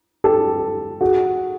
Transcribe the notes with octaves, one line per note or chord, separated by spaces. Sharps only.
G4 A4
F#4 G#4